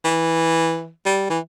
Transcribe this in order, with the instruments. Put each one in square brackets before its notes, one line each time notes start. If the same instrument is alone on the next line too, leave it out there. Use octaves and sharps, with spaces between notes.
[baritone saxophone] E3
G3
E3